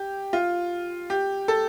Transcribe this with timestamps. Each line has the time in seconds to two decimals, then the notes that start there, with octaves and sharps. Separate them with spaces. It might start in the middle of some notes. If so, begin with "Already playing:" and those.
Already playing: G4
0.33 F4
1.10 G4
1.48 A4